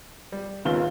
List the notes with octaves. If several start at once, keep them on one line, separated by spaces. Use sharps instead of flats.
G3
G#1 D#2 C#3 B3 F4 G7